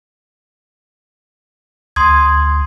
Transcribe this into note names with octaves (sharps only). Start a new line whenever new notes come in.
D2 C6 D#6 G#6